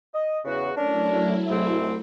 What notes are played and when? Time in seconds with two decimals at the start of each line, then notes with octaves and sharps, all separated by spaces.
0.14 D#5
0.44 E2 C#3 F#4
0.76 F#3 A3 C#4 D4 E4 A#4
1.49 C2 G#2 C4